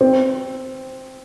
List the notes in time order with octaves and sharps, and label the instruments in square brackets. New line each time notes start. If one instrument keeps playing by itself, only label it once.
[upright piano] C4